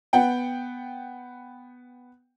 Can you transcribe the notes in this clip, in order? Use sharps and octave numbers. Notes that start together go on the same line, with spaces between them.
B3 F#5 G5